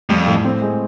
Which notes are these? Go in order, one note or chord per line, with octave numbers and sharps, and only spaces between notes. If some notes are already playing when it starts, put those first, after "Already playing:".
F2 G3
A2
C4
G#3